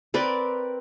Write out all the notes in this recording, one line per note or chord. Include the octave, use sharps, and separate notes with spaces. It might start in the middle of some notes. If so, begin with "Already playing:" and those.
C4 A#4 B4 D5